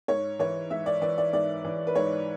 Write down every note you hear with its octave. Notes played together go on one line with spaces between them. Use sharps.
G#2 C#5
E3 C#5
G#2 E5
D5
E3 D5
D5
G#2 D5
E3
B4
G#2 C#5